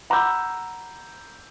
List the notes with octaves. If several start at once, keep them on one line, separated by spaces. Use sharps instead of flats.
F#5 A#5 B5 D6 E6 G6